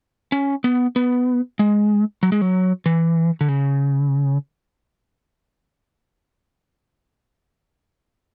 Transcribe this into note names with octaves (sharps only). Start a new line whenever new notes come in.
C#4
B3
B3
G#3
F#3
G#3
F#3
E3
D3
C#3